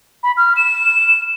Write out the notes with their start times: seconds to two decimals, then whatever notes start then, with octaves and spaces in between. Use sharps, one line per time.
0.23 B5
0.37 F6
0.56 E7